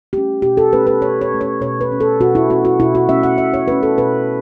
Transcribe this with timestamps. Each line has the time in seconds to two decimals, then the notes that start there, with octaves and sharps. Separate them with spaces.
0.13 A3 C#4 G4
0.42 B2 G4
0.57 A4
0.72 A3 C#4 B4
0.87 B4
1.01 B2 C#5
1.21 C#5
1.32 A3 C#4
1.41 C#5
1.61 B2 C#5
1.81 B4
1.90 A3 C#4
2.00 A4
2.20 B2 F#4
2.35 E4
2.50 A3 C#4 F#4
2.65 F#4
2.80 B2 E4
2.95 F#4
3.09 A3 C#4 E5
3.23 F#5
3.38 B2 E5
3.54 C#5
3.68 A3 C#4 B4
3.83 A4
3.98 B2 B4